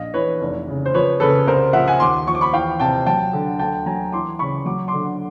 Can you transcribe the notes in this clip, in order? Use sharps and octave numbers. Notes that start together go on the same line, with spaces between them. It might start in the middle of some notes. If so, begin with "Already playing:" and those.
Already playing: A#1 D#5 F5
E3 B4 C#5
F1
C#3
C5
F3 B4 C#5
C#3 A4 B4
C2 A#4 C5
F3 E5 F#5
F#5 G#5
D#2 C6 D6
F3 C#6
D6
B5 C#6
E3 F5 G5
C3 G5 A5
F#3 G5 A5
D3
D2 G5 A5
F#3 G#5 A#5
E3 C6 D6
C#3 B5 C#6
F#3 D6
C6 D6
D3